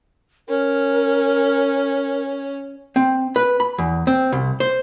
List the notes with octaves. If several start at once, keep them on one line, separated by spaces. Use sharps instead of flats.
C#4 A#4
C4
B4
B5
E2
C4
C2
C5